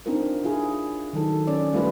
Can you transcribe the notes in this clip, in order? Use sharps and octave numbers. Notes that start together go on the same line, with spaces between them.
C4 D4 D#4 F4 A#4
D4 E4 F4 G#4
D#3 F#3 A4
C#4 D5
G3 A3 F4 B4 D5